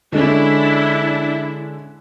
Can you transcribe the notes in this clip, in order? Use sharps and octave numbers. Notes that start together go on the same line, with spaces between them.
D3 G#3 C#4 D4 E4